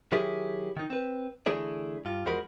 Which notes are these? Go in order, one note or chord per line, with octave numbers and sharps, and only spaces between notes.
D#3 F#3 E4 G4 G#4
D#3 D#4
C4 B4
D3 E3 A3 E4 G#4 D5
G2 F4
E2 F3 G#3 F#4 A#4 B5